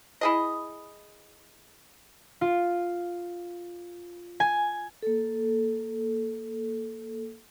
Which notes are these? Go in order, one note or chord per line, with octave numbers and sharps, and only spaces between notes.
E4 G#4 D#5
F4
G#5
A#3 A4